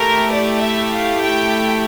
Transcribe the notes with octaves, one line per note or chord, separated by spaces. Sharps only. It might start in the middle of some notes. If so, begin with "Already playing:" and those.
Already playing: A3 E4 G4 A#4
D5
E5
F5
G5